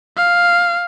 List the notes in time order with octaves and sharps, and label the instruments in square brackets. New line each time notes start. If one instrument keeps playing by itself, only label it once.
[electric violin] F5